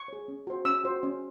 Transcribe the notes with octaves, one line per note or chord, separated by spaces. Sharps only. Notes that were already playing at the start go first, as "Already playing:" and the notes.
Already playing: C#6
G#4 C#5
C#4
F#4 C5
C#4 E6
F#4 C5
C#4